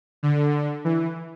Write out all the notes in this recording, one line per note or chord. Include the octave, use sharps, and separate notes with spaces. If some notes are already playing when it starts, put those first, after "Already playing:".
D3
E3